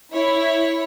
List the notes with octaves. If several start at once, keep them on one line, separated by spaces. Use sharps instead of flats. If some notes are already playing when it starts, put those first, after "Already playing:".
E4 C#5